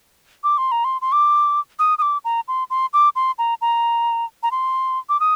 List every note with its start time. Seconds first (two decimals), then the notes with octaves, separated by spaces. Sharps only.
0.44 D6
0.58 C6
0.72 A#5
0.84 C6
1.02 C6
1.12 D6
1.79 D#6
1.98 D#6
2.02 D6
2.25 A#5
2.48 C6
2.70 C6
2.93 D6
3.16 C6
3.38 A#5
3.61 A#5
4.43 A#5
4.51 C6
5.09 D6
5.20 D#6